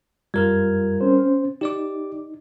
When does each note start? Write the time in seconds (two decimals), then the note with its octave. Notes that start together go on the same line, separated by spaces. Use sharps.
0.34 F#2 G3 F4 A#4 F6 G#6
1.01 C4 C#4 C5
1.61 D#4 G4 D5 D6